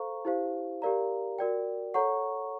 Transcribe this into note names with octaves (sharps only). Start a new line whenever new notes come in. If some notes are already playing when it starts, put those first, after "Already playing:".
Already playing: A4 C5 F5 A#5 C#6
E4 G4 C5 F5
G4 A#4 D5 F5 A#5
F#4 A#4 D5 G5
A4 C#5 F#5 A#5 C#6